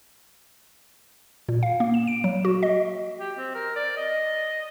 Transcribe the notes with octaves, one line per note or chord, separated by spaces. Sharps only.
A#2
F5
A#3
E7
D7
F#3
F#4
D#5
G4
C4
A#4
D5
D#5